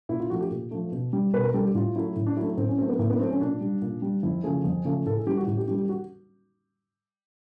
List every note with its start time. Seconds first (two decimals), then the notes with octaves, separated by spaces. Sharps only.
0.09 A#2 E4
0.20 F4
0.30 F3 A3 F#4
0.41 G4
0.51 A#2
0.71 F3 A3
0.92 B2
1.13 G3
1.33 B2 B4
1.43 A#4
1.54 G3 A4
1.65 G4
1.74 A2 F4
1.95 F#3 A3 E4
2.16 A2
2.26 D4
2.37 F#3 E4
2.42 A3
2.57 A2 C4
2.68 C#4
2.78 F#3 A3 C4
2.89 B3
2.99 A2 A#3
3.10 B3
3.19 F#3 A3 C4
3.31 C#4
3.40 A#2 D4
3.61 G3
3.82 A#2
4.02 G3
4.23 F2 E4
4.43 C#3 F3 A3 G#4
4.64 F2
4.85 C#3 F3 A3
5.06 A2 A4
5.17 G#4
5.27 E3 G3 G4
5.37 F#4
5.47 A2 F#4
5.57 G4
5.68 E3 G3 G4
5.78 G4
5.89 F#4